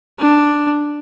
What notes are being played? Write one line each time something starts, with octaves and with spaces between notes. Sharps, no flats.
D4